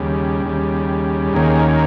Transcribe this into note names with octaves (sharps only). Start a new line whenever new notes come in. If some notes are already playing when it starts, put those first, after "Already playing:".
Already playing: D#2 C#3 G3
D#2 C#3 G3
D#2 D#3 A#3 C#4 G#4